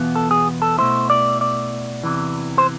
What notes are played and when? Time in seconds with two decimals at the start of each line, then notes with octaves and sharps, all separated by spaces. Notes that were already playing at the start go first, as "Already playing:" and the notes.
Already playing: E2 B2 B3 F4
0.16 A4
0.31 G#4
0.62 A4
0.78 B2 A3 E4 C5
1.10 D5
1.41 D5
2.04 E2 C3 E3
2.58 C5